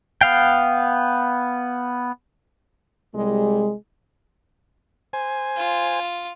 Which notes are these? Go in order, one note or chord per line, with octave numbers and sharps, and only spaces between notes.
B3 F5 G5
C2 G3 G#3
C5 G#5
F4